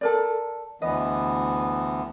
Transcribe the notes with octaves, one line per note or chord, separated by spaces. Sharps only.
A4 A#4 D5
D2 E3 B3 B4 D#5